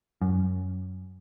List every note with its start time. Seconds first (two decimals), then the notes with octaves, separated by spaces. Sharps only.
0.21 F#2